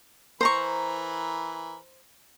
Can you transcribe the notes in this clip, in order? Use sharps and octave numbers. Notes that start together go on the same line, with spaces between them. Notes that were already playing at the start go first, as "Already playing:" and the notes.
E3 A#4 C5 A#5 B5 C#6